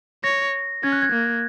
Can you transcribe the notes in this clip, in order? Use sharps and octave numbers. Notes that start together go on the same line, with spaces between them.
C#5 A#6
C#4 G#6
F#6
G#6
A#3